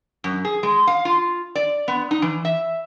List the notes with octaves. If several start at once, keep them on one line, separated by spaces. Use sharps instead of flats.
F#2
G#4
G#3
F5
F4
D5
B3
D#4
E3
E5